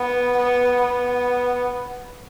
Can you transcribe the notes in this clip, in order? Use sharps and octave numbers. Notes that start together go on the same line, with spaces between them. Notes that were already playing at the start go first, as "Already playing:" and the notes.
Already playing: B3
B3
B3